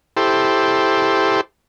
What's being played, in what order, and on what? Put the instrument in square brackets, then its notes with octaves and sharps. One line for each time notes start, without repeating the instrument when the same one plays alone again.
[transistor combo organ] E4 G4 A4 C5